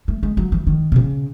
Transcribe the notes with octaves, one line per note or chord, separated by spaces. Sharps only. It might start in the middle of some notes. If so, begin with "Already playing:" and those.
A3
G#3
F#3
E3
D#3
B2
C#3